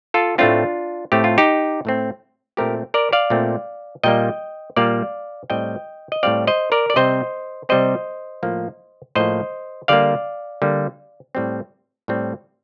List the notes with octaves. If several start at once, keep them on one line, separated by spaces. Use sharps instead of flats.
F4 A4
A2 A3 C4 D4 F4
A2 A3 C4 G4
F4
D#4 G4
A2 A3 C4
A#2 A3 C4 G4 A#4
A#4 D5
D5 F5
A#2 A3 C4
A#2 G3 A#3 D#5 G5
A#2 G3 A#3 D5 F5
A2 G3 C4 D#5 G5
D#5
A2 G3 C4 D5 F5
C5 D#5
A#4 D5
D5
C3 G3 C4 C5 D#5
C3 G3 C4 C5 D#5
A2 F3 A#3
A2 F3 A#3 C5 D#5
D3 G3 A#3 D5 F5
D3 G3 A#3
A2 G3 C4
A2 G3 C4